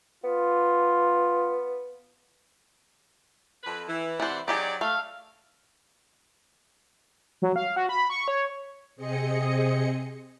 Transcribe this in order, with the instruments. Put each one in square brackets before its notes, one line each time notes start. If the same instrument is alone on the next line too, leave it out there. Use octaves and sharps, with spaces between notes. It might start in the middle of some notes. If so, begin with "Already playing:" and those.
[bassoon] B3 [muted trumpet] F4
[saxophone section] F2 B4
E3
[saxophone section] C3 D5 F#5 [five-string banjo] E3 C5
[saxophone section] F#3 D5 [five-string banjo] D#4 G4 G#4
[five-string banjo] A3 [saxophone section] A4 E5 F5
[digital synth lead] F#3
F5
F#4
B5
C#6
C#5
[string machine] C3 C4 G#4 D#5 C#7